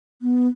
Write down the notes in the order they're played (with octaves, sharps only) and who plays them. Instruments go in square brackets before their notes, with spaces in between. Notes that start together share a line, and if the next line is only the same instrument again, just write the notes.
[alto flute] B3